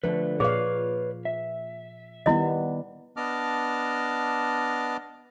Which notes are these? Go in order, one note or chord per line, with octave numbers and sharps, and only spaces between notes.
D3 F3 A3 B4
A#2 G#4 B4 C#5 D5 F5
E5
D#3 G3 B3 E4 D#5
B3 D4 D#5 A5 D6 F6